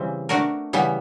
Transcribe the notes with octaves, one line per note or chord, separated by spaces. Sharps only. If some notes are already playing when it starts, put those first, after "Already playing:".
Already playing: C#3 E3 G3 C4
A3 D4 F#4 A#4
C#3 E3 G3 B3